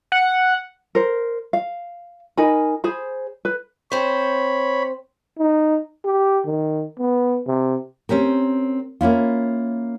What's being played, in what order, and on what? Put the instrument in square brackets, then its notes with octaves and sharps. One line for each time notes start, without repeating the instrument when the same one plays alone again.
[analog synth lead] F#5
[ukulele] A#4 C5
F5
D#4 A#4 G#5 B5
G#4 C5 B5
B4
[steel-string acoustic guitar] C4 C5 [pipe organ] C#5 B5
[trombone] D#4
G4
D#3
B3
C3
[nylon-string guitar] C4 C#4 G4 A#4
A#3 C#4 E4 F4